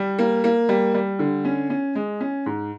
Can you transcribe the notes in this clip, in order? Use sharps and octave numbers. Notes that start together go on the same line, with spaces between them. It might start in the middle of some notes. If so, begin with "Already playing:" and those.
Already playing: G3
A#3
A#3
G3
G3
D3
C#4
C#4
G#3
C#4
G#2